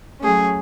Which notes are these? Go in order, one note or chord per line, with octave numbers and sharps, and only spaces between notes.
F#3 A3 C#4 G#4